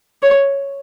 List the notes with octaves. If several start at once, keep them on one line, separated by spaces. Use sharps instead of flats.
C#5